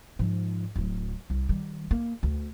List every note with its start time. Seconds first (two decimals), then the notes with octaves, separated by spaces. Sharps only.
0.19 G#2 F3
0.76 D1 F#3
1.30 C2
1.49 D#3 G3
1.91 A#3
2.23 D2